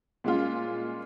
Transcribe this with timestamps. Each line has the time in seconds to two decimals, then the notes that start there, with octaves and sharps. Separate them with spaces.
0.24 A#2 G#3 C#4 F4